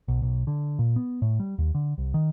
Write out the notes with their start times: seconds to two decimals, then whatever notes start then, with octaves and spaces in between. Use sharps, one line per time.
0.08 B1
0.22 B1
0.47 D3
0.79 A#2
0.96 B3
1.22 A2
1.40 G3
1.58 D#2
1.75 D3
1.98 C2
2.14 D#3